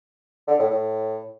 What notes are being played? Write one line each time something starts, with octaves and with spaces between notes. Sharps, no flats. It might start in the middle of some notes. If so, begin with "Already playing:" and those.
D3
A2
A2